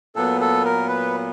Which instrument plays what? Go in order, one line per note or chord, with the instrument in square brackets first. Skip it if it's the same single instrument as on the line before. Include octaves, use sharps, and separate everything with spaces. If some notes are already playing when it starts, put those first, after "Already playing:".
[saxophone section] A#2 F#3 B3 [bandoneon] A4
[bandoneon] A4
A#4
B4